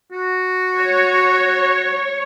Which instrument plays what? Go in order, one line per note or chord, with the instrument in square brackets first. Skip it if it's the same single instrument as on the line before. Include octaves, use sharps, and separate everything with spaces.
[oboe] F#4
[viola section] C#5